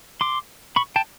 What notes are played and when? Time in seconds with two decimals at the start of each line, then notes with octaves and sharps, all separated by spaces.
0.21 C6 D6
0.76 B5 C#6
0.96 G5 A5